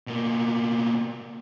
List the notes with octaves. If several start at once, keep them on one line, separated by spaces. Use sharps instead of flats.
B2 A#3